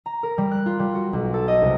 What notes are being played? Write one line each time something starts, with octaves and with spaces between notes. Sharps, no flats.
A#5
A#4
G3
F#6
F4
G3
F#4
B1
A4
D#5
C2